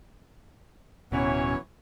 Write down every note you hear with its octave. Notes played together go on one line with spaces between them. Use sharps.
D1 B2 E3 F#3 C#4 C#5